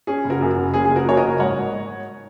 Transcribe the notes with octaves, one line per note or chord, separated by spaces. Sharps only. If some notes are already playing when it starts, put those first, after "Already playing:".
C#4 G#4
F#1
F#4 A#4
F#2
F#1
C#4 G#4
F#1 G#4
F#4 A#4
F#3 C#5
A#4 D#5
F#1
G#2 C#5 F#5
G#2
G#2